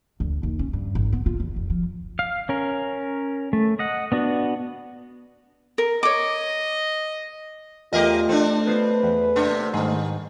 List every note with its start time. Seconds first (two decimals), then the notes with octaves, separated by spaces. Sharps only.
0.20 D2
0.43 D#2
0.59 C#4
0.73 G2
0.95 G#1
1.13 B3
1.26 F4
1.40 E2
1.56 F1
1.70 F3
2.19 F5
2.49 C#4 A#4
3.53 A3
3.79 D#5 F#5
4.12 B3 D4 F#4
5.78 A#4
6.03 C#5 D#5 D6
7.93 E2 A3 F4 G4 A#4 D#5
8.29 C4 D4 A4
8.67 B3 F4 B4 C5
9.03 E2
9.36 C3 A#3 D4
9.73 G#2 D#3 G3